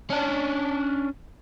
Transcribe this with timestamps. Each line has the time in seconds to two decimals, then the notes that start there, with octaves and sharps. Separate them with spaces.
0.10 C#4 D4